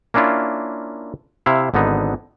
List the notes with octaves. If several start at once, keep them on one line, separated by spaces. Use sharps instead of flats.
A#3 C#4 D4 E4 F4
C3 E4 F5
G#1 D3 B3 D#4